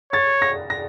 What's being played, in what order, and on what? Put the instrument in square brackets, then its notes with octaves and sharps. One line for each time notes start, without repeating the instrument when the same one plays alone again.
[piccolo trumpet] C#5 [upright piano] A6
[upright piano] A#6
A#6